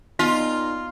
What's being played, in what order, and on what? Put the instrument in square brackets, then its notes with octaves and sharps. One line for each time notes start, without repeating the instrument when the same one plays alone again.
[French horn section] A#2 D#4 [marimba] B3 [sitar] F4